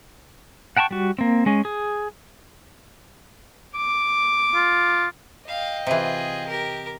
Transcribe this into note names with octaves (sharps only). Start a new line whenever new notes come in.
F#5 G5 A5 A#5 C#6
G3 F#4
A#3 C4
G#3 C#4
G#4
D6
F4
D#5 F5 G5
C3 E3 F4 G#4
G4 A#4